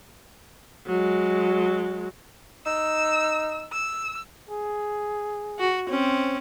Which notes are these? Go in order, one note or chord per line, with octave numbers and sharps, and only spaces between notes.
F#3 G#3
D#4 E6
E6
G#4
F#4
C4 C#4 C5